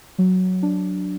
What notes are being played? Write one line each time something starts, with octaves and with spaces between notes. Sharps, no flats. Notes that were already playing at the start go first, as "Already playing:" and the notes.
F#3
D4